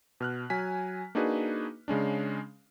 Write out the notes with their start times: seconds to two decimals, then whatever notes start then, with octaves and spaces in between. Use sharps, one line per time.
0.20 B2 F6 F#6
0.50 F#3 G#5 B6
1.15 A#3 D4 D#4 F#4 G#4 B4
1.88 C#3 G#3 C#4 D4